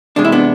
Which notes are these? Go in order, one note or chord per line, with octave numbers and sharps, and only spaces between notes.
E2 C3 G#3 D4
E4
B3 D4